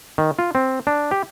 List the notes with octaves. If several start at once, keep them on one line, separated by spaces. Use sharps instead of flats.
D#3
F4
C4
D4
G4